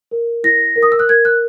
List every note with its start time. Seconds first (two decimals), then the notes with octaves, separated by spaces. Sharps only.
0.11 A#4
0.44 E4 A#6
0.76 A#4
0.83 D#6
0.92 E6
0.99 F#6
1.09 A#4 G#6
1.25 F#6